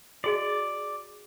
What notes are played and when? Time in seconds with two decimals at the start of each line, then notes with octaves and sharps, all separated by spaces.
0.24 F#4 G#4 D5 D#5